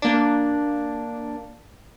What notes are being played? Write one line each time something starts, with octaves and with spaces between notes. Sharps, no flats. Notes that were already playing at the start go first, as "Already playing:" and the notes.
A#3 D4